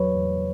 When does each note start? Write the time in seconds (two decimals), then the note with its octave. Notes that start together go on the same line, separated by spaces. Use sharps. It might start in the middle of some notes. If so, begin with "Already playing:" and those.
Already playing: E2 F#3 B4 C#5
0.17 E2